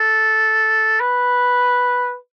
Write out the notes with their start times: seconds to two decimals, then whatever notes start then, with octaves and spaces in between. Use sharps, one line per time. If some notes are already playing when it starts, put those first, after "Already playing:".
Already playing: A4
1.00 B4